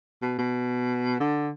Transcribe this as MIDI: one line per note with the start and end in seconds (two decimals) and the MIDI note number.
0.22 0.35 47
0.39 1.16 47
1.20 1.50 50